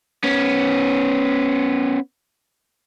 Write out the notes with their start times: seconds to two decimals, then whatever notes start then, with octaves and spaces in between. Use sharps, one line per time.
0.24 B3 C#4